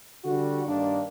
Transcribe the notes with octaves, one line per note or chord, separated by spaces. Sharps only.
D3 G3 F#4
G2 D#3 A#3 D4